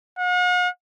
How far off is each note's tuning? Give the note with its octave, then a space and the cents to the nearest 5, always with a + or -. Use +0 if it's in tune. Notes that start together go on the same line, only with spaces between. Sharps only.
F#5 -45